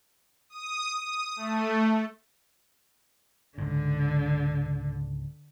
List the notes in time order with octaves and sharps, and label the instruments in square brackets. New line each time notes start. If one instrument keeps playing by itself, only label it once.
[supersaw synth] D#6
D#6
A3
[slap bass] C#2 G#2 [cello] D3